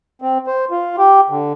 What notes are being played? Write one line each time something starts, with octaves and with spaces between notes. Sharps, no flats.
C4
C5
F4
G4
D3